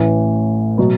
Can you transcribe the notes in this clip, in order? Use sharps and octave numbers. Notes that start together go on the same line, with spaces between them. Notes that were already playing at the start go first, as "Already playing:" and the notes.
Already playing: A1 A2 E3
B2 F#3 B3